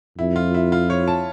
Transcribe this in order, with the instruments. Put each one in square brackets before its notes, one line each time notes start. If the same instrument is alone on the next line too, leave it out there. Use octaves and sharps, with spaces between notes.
[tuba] F2 [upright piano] E4
[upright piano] F4
E4
F4
C#5
A5